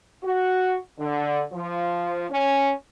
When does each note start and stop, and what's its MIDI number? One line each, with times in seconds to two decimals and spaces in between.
0.24 0.75 66
0.99 1.41 50
1.52 2.24 53
2.30 2.71 61